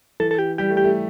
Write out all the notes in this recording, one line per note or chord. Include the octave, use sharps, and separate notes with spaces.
E3 A4
A4
G4
G3 G4
A3
G4
A3